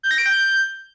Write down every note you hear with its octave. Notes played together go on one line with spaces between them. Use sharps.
G6
A#6
D7
G6